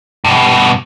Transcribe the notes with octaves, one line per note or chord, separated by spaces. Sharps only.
G2 B2